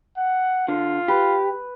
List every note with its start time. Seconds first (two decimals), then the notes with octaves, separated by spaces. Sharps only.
0.17 F#5
0.68 D3 F4
1.08 G4 B4